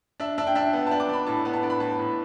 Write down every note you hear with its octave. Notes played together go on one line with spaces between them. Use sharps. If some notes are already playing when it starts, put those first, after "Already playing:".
D4 E5
D4 E5
G5
D4 E5
B3
D4 A5
D6
D4 B5
A2 A5
B3
A5
D4
B5
A2 A5
A2